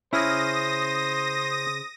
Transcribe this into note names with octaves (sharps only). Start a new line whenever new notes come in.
C#3 C#4 E4 C5 D#6 F6 A#6